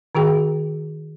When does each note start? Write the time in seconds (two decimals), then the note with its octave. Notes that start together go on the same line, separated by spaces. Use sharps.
0.15 D#3 F#4 G#4 G5